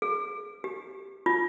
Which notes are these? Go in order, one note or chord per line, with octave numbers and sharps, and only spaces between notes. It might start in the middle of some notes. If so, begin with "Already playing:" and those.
G#4
G4
F4